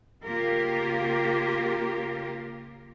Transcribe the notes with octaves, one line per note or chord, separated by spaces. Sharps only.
C#3 A#3 F4 G4 A#4